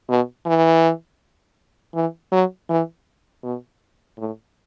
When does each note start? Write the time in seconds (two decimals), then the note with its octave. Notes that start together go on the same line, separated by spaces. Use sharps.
0.09 B2
0.46 E3
1.95 E3
2.32 F#3
2.70 E3
3.43 B2
4.18 A2